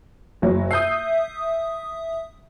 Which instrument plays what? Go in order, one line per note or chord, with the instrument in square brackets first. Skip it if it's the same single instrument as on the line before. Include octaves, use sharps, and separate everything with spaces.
[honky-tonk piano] F#1 F#3
[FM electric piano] E5 D#6 [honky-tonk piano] G6 C7